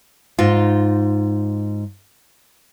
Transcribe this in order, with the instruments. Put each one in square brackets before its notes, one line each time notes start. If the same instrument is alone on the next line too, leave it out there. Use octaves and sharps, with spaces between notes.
[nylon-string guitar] G#2 D#4 F4